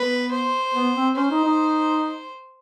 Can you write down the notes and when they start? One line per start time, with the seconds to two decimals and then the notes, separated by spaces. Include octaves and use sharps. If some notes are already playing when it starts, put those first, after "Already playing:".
Already playing: B3 B4
0.32 C5
0.74 B3
0.95 C4
1.16 C#4 C5
1.31 D#4
1.45 D#4